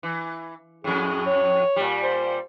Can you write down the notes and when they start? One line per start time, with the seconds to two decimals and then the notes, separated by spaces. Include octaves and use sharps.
0.03 E3
0.84 F2 A2 G#4
1.27 C#5
1.76 A#2 G3
2.04 C5